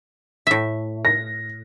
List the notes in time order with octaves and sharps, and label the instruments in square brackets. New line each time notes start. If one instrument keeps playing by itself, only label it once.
[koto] A2 E5
[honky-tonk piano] A#6